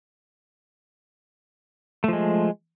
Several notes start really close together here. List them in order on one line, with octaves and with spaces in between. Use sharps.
A3 F3 G#3